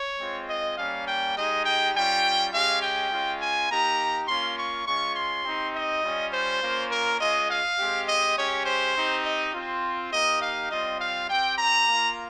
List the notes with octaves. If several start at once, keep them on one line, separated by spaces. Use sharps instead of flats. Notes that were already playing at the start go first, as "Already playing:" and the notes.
Already playing: C#5
G#3 C4 F4
D#5
G3 A#3 C#4 F5
G5
G#3 D#4 G4 D#5
G5
G3 C#4 F4 G5
G#3 C#4 G4 F5
G5
G#3 C#4 F4
G#5
A#3 D#4 G4 A#5
A#3 C#4 F4 C6
C#6
G#3 C#4 F4 C#6
C6
C4 D#4 G4
D#5
G3 C#4 F4
C5
A#3 C#4 F4
A#4
G#3 C#4 F4 D#5
F5
G#3 C4 G4
D#5
G#3 C#4 G4 C#5
C5
C4 D#4 G4
D#5
C4 F4
A#3 D#4 G4 D#5
F5
G3 C4 F4 D#5
F5
C4 G4 G5
A#5
A#3 F4